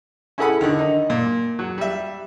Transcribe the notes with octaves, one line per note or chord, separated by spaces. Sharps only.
C#4 E4 G#4 A4 F#5 B5
D3 D#3
D#4
A#2
F#3
G3 E5